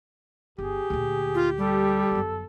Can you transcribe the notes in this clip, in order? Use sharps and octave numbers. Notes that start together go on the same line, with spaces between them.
G1 G4 G#4
D2 A#2
F4
G3 A4
G1 F#2